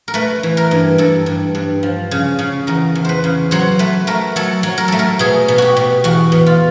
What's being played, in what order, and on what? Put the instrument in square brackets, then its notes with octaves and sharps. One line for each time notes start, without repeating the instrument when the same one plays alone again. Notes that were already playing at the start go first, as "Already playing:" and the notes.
[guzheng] A#4
A3 B4
E3
A#4
G2
G2 A4
G2
G2
F3
C#3
C#3
E2 A#4
E2
B4 C5
C#3
F#3 C5
A3 B4
A3 A#4
F#3 A4
F#3
A#4
A3 A4
A#4
B2 G#4
B2
F#4 G4
B2
E2 F#4
B2
F4